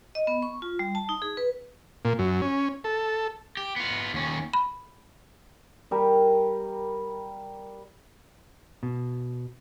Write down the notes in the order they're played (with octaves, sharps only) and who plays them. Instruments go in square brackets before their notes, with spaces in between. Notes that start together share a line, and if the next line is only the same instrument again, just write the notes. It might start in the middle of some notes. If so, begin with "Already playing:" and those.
[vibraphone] D#5
B3
C#6
F4
G3
A5
D#4
G#4
B4
[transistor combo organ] A#2
F#2
C#4
A4
[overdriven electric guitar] G4
B3 F4
D#2 C#4
[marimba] B5
[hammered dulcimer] G3 A#4
[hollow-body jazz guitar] B2